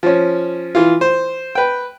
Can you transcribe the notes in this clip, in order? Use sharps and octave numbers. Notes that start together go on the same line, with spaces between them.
F3 C#4
E3 F4
C5
B4 G5